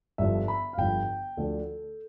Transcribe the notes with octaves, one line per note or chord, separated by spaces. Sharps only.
G1 G2 F3 E5
B5
F5
G1 G2 F3 G5
D2 D3 F3 A3 D4 A4